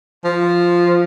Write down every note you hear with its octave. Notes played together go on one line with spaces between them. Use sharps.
F3